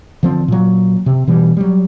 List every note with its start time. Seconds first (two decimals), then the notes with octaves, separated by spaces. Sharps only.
0.23 D3 F3 C4
0.48 A#2 F#3
1.06 C3
1.27 B2 E3 G3
1.57 F#3 G3